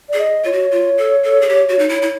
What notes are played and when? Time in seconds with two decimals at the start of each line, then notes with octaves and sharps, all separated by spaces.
0.09 G#4 D5
0.19 D#5
0.44 F4 C#5
0.52 F#4
0.72 F4
0.98 A4
1.23 A4
1.41 G#4
1.49 G4
1.69 F#4
1.79 D#4
1.89 E4
2.02 E4